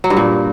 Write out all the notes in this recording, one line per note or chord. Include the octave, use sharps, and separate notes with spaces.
F#3
G2
A#2